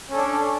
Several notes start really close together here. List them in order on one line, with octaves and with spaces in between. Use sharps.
C#4 A4 D4